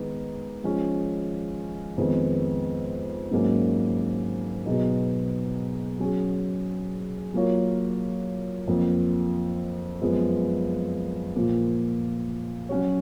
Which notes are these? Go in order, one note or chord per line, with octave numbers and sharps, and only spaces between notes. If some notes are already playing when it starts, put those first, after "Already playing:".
Already playing: D#3 G#3 B3 D#4
F3 G#3 C#4
F2 D#3 G#3 B3
G#2 F#3 A#3 C#4
B2 F#3 B3 D#4 G#4
F#3 C#4 G#4
F#3 A#3 F4 A#4 C#5
F2 F3 A#3
F#2 F3 G#3 B3
A#2 F3 A#3
F#3 C#4 F#4 C#5